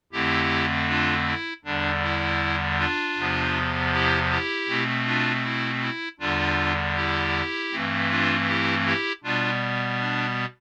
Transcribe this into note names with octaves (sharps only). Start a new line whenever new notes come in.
F2 D3 A3 C4 E4 G4
D4 F4
E4
E2 D3 G3 D4
E4
D4 F4
E2 C3 F3 B3
E4 G4
E4 G4
B2 A3 C4
D4 F4
E4
E4
E2 D3 G3 D4 F4
E4 G4
G2 E3 A3 C4
D4 F4
E4 G4
E4 G4
B2 G3 B3 D4 F4
D4